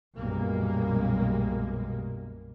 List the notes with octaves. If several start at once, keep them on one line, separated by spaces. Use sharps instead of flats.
B1 F#2 A#2 G3 G#3 A#3